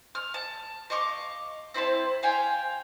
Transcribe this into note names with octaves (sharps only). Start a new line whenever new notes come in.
F6
A5
D#5 F5 C#6 D6
C4 E4 C5 A5
F5 G5 G#5